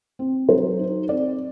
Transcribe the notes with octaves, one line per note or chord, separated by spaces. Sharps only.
C4
F#3 C5
D#4
C4 D5